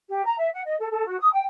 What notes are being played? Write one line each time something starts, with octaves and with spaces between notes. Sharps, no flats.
G4
A#5
E5
F#5
D#5
A4
A4
F#4
D#6
G5